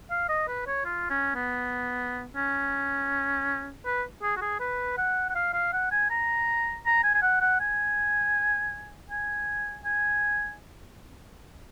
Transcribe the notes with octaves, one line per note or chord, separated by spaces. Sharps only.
F5
D#5
B4
C#5
F4
C#4
B3
C#4
B4
G#4
F#4
G#4
B4
F#5
F#5
F5
F5
F#5
G#5
A#5
A#5
G#5
G#5
F#5
F#5
G#5
G#5
G#5